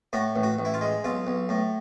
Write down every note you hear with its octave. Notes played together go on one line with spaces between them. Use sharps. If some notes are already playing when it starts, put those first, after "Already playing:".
A2 F#4
A1
F#4
A1
E4
F4
G#3
B1 F4
B1
A2